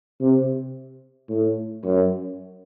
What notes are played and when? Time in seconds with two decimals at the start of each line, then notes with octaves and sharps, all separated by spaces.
0.21 C3
1.30 A2
1.84 F#2